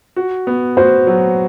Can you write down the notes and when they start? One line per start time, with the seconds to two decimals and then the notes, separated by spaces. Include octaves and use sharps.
0.16 F#4
0.47 B3
0.77 F#4 C5
1.07 F#3